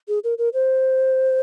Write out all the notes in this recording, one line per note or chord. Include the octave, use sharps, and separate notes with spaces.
G#4
A#4
A#4
C5